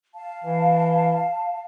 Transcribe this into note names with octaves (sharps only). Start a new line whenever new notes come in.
F5 A5
E3